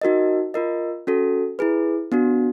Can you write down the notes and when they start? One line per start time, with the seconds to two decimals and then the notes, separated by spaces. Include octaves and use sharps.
0.02 D#4 F#4 A#4 D#5
0.54 F4 A#4 D#5
1.07 C#4 F#4 A4
1.59 E4 G#4 B4
2.12 B3 D4 F#4